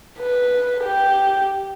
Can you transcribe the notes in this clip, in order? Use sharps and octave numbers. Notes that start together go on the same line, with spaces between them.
B4
G4